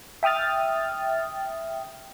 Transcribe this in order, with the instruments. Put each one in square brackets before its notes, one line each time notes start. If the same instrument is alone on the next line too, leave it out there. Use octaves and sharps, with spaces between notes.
[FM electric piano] E5 G5 D#6 F6 A6